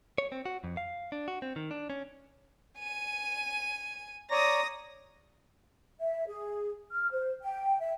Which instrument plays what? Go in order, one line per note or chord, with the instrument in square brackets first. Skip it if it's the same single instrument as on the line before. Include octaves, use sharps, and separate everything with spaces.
[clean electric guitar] C#5
C4
F#4
F2
F5
D4
F#4
C4
D#3
D4
C#4
[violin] G#5 D#7
[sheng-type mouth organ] C#5 D5 A#5 [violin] D#6 A#6
[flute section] E5
G#4
F6
C5
G5
E5